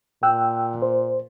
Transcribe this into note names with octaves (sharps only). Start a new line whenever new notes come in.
A#2 G5 E6 F#6
C5